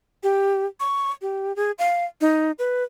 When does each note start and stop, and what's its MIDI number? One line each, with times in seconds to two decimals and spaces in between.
0.23 0.66 67
0.80 1.11 85
1.22 1.55 67
1.56 1.71 68
1.79 2.05 77
2.21 2.52 63
2.59 2.83 71